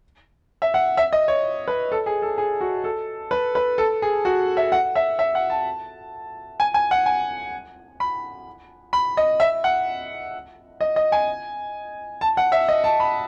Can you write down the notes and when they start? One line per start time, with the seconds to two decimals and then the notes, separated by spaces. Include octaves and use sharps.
0.62 E5
0.74 F#5
0.97 E5
1.13 D#5
1.28 C#5
1.68 B4
1.92 A4
2.06 G#4
2.22 A4
2.38 G#4
2.61 F#4
2.84 A4
3.31 B4
3.55 B4
3.78 A4
4.02 G#4
4.25 F#4
4.57 E5
4.72 F#5
4.95 E5
5.19 E5
5.35 F#5
5.50 A5
6.60 G#5
6.74 G#5
6.91 F#5
7.06 G#5
8.00 B5
8.93 B5
9.17 D#5
9.40 E5
9.64 F#5
10.81 D#5
10.96 D#5
11.12 G#5
12.21 A5
12.37 F#5
12.52 E5
12.68 D#5
12.84 A5
13.00 B5